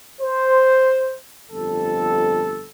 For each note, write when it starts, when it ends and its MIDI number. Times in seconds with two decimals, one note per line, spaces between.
0.21 1.15 72
1.50 2.69 31
1.50 2.69 41
1.50 2.69 69